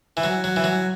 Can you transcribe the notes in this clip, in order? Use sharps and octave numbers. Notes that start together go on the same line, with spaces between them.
E3
F#3
F#3
E3
F#3